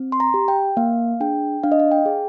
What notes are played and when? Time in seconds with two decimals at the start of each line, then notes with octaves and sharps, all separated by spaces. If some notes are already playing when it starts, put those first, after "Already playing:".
Already playing: C4
0.12 C6
0.20 A#5
0.34 G4
0.48 G5
0.77 A#3 F5
1.20 D4 G#4 G5
1.64 D4 F5
1.72 D#5
1.80 F5
1.91 G5
2.06 G#4